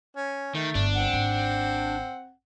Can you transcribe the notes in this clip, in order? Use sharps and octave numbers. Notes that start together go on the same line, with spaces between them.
C#4
D#3 A3
G1 D4
C4 F#5
G#1